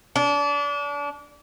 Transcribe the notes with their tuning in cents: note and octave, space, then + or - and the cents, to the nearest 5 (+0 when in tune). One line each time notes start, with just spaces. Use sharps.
D4 -30